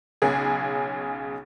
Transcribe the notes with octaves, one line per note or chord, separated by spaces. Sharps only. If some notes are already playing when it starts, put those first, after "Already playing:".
B1 C#3 G#4